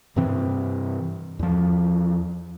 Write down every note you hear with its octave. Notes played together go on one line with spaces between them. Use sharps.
G2 C3 E3 C4
E2 F3